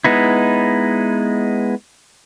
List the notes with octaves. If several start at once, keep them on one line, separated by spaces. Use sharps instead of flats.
G#3 B3 D#4 E4